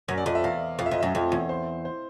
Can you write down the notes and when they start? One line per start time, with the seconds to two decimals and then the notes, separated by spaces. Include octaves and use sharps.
0.08 F#2 C#5
0.18 D5
0.26 F2 D#5
0.35 E5
0.44 E2 F5
0.79 F2 F5
0.86 E5
0.91 F2 D#5
1.00 F#2 E5
1.15 F2 D#5
1.31 E2 C#5
1.49 C5
1.85 C5